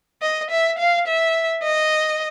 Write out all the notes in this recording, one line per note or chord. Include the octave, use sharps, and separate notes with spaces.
D#5
E5
F5
E5
D#5